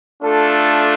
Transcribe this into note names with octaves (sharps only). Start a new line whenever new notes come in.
A3 D4 F4 A4